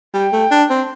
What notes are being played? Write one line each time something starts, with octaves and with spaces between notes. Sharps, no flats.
G3 G5
A3
D4
C4